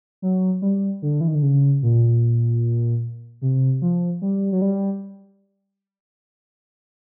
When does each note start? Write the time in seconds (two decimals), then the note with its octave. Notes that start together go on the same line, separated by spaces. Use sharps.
0.22 F#3
0.62 G3
1.02 D3
1.21 E3
1.28 D#3
1.35 D3
1.42 C#3
1.82 A#2
3.42 C3
3.82 F3
4.22 G3
4.52 F#3
4.62 G3